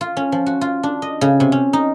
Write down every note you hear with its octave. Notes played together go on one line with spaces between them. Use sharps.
F4
C#4
F3
F#4
F4
D4
D#5
C#3
C3
C#4
D#4